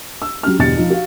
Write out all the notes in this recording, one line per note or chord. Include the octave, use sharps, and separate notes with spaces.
E6
F#3 C#4 G4 F6
G1 E2 B2 G4 A6 C#7
F3 D#4
F#4 F5